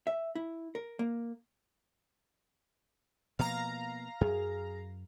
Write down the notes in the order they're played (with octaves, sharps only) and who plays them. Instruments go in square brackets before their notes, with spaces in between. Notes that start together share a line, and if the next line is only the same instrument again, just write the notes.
[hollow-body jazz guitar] E5
E4
A#4
A#3
[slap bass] B2 F3 A#3 [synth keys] F5 A#5
[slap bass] F#2 [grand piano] G#4